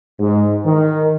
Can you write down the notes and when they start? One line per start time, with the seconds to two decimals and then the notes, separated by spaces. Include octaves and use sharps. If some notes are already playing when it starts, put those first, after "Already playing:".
0.19 G#2
0.65 D#3